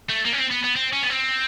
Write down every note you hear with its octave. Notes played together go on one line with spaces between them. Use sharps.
A3
A#3
C#4
C4
B3
B3
C4
C#4
B3
C4